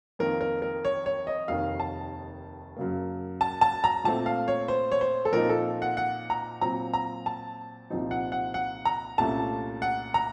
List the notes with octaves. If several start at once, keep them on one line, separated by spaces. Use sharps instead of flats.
F2 D#3 A#3 A#4
A#4
A#4
C#5
C#5
D#5
F1 D#2 D#3 F5
A5
F#2 C#3 F#3 A#3
A5
A5
A#5
A#2 A3 C4 A5
F5
C#5
C5
C#5
C5
A4
A#2 F3 C4 D#4 A#4
A4
F#5
F#5
A#5
A#2 F#3 C4 A#5
A#5
A5
C2 A#2 F3 C4 D#4
F#5
F#5
F#5
A#5
C2 A#2 A3 C#4 A5
F#5
A#5